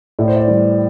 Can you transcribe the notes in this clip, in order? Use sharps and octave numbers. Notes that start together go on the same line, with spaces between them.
A2 D5
C5
D5
E3 G3